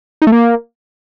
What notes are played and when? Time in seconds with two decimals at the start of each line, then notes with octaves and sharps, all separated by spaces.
0.22 D#4
0.27 A3
0.32 A#3